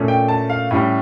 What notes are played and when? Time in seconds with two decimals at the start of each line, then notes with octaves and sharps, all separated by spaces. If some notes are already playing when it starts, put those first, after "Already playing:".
Already playing: A#2 A3 C#4
0.08 G5
0.28 A5
0.50 F5
0.71 A2 G3 C#4